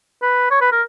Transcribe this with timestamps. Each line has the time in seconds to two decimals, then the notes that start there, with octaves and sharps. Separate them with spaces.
0.22 B4
0.51 C#5
0.61 B4
0.72 A#4